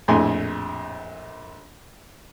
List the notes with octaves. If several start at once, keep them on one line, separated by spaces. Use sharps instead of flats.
A#1 F2 A2 G#5 C6